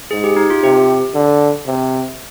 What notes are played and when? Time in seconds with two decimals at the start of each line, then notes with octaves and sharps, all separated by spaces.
0.11 G#2 G#4
0.24 G4
0.36 D#4
0.50 F4
0.63 C3 G4
1.14 D3
1.66 C3